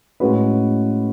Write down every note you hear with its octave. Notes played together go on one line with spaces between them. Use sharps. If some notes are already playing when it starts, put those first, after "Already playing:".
A2 G#3 C#4 F#4 B4